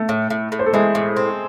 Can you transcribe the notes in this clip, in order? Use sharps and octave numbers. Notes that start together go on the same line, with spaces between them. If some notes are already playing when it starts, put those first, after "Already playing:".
Already playing: A3 A4
A2
A2
A2
C5
A4
E3 G#3 G#4
A2
C4